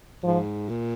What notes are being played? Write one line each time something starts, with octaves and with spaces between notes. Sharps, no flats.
G#2 F3
A#2